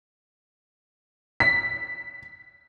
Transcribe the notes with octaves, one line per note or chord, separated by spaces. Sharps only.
B6